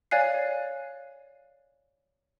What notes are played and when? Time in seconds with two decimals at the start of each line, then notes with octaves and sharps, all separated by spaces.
0.11 C#5 D5 F5 G#5 F#6 C7